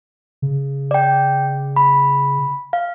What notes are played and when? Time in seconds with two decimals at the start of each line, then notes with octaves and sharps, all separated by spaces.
0.42 C#3
0.91 D5 G5
1.76 B5
2.73 F5